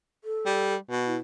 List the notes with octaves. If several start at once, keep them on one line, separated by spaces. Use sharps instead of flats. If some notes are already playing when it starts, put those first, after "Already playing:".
A4
G3
B2
E4